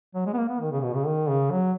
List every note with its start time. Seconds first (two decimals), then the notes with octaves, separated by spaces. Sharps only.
0.15 F#3
0.27 G#3
0.34 B3
0.38 A#3
0.49 B3
0.61 D#3
0.73 C#3
0.83 B2
0.95 C#3
1.07 D#3
1.29 C#3
1.52 F#3